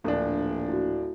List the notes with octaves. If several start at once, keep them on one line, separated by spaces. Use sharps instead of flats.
D1 A#1 D4
E4 F#4